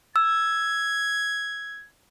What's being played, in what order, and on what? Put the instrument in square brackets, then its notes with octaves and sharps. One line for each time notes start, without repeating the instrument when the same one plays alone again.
[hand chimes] E6 [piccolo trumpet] G#6